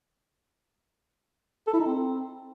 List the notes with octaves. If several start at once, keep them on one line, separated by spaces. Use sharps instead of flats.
A4
E4
D#4
C4